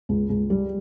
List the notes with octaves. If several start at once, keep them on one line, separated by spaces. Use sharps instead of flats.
C#2
C#2
G3